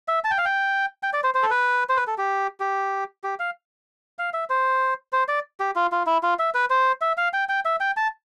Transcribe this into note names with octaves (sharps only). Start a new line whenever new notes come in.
E5
A5
G5
F5
G5
G5
D5
C5
C5
A4
B4
C5
B4
A4
G4
G4
G4
F5
F5
E5
C5
C5
D5
G4
F4
F4
E4
F4
E5
B4
C5
E5
F5
G5
G5
E5
G5
A5